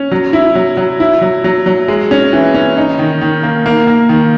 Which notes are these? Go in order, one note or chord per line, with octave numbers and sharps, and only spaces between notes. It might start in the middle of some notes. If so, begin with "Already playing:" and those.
Already playing: C#4
F#3
E4
F#3
F#3
E4
F#3
F#3
F#3
G#3
C#4
E3
C#4
D#4
D#3
D#3
A#3
A#3
A#3
D#3